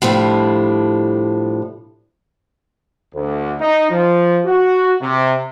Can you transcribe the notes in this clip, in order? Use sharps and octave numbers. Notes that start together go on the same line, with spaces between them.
A2 F3 G3 D4
D2
D#4
F3
F#4
C3